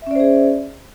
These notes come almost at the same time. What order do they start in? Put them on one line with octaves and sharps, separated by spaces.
E5 C#4 D5 C5 G#4